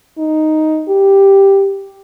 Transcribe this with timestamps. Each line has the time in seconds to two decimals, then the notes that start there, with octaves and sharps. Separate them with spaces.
0.18 D#4
0.89 G4